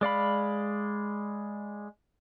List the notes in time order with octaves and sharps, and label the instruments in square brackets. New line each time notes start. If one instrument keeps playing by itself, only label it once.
[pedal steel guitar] G#3 D5 F5 B5